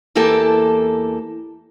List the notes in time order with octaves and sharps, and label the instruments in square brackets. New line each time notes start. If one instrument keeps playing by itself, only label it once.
[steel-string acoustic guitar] E2 E3 A#3 G4 A4 A5